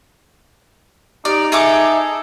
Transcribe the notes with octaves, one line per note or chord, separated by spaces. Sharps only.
D#4 G4 D5
G#4 A4 E5 D6